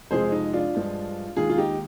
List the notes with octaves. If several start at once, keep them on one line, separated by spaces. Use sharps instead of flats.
F2 C3 F3 G#3 G#4 C5
D#4
D4 F4
G2 F3 G#3
D#2 D#3 G#3 F4 G#4
F4
D#4 G4